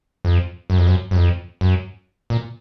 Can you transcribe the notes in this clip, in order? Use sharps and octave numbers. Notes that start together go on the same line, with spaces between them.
F2
F#2
F2
F#2
F#2
F2
F#2
A#2